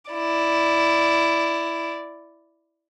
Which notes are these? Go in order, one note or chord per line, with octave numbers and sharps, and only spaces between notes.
E4 D5